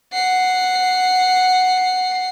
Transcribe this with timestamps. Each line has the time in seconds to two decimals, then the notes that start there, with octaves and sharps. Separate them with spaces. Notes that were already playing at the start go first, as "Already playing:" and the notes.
0.13 F#5 C7